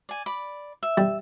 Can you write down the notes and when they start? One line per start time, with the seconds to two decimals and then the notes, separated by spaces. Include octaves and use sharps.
0.09 D5 G#5
0.26 D5 B5
0.83 E5
0.97 G3